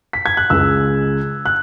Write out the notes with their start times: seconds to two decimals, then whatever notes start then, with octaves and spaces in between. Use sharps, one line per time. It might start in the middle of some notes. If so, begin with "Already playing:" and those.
0.13 B6
0.26 G#6
0.37 F#6
0.50 C#2 C#3 G#3 E6
1.46 F#6